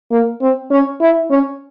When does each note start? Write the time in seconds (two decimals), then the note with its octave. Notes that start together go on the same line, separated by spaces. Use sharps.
0.11 A#3
0.41 C4
0.71 C#4
1.01 E4
1.30 C#4